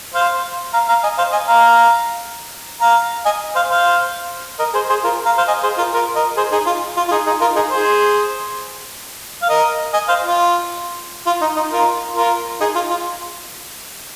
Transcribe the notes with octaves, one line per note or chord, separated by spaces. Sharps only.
C5 F5
F5 A#5
F5 A#5
D#5 G#5
C5 F5
D#5 G#5
F5 A#5
F5 A#5
D#5 G#5
C5 F5
C5 F5
A#4 D#5
G#4 C5
G#4 C5
F4 A#4
F5 A#5
C5 F5
D#5 G#5
G#4 C5
F4 A#4
F4 A#4
A#4 D#5
G#4 C5
D#4 G#4
F4
F4
F4
D#4 G#4
D#4 G#4
F4 A#4
D#4 G#4
G#4 C5
F5
A#4 D#5
D#5 G#5
C5 F5
F4
F4
D#4
D#4
F4 A#4
F4 A#4
D#4 G#4
F4
F4